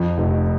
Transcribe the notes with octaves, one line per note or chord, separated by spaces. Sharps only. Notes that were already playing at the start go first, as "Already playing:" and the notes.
Already playing: F2
F1